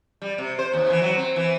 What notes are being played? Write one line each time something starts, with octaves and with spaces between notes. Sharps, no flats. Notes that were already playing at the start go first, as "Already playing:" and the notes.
G3
C3
C5
D#2
E3
F#3
C4
E3